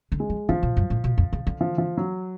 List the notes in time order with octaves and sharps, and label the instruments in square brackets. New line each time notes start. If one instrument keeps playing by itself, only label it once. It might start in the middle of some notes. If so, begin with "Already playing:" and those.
[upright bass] D3
[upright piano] G#3
[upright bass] F3
[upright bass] D3 [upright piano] F3
[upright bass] B2
F#2
A2
B2
F2
C#3
D3
[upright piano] F3
F3
F#3